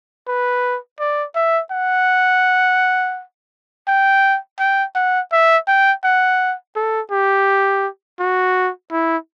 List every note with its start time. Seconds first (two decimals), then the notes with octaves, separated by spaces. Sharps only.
0.27 B4
1.00 D5
1.35 E5
1.71 F#5
3.88 G5
4.59 G5
4.95 F#5
5.32 E5
5.67 G5
6.04 F#5
6.76 A4
7.11 G4
8.20 F#4
8.92 E4